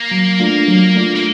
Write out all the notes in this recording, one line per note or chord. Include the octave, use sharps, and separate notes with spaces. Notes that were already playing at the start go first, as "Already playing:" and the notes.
Already playing: A#3
F#3
A3 D4 F4
F#3
A3 D4 F4
A#3